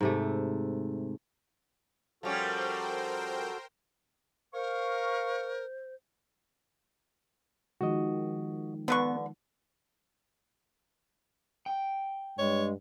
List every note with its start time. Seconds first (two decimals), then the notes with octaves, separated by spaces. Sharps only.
0.01 G#2 C3 A3
2.23 F3 G3 C#4 F#4 A4 A#4 C5 G5
4.54 A#4 C5 F5 C#6
7.81 D#3 F3 G#3 F#4 D#5
8.88 D3 B3 B4 C#6
11.66 G5
12.39 G2 G#3 C#5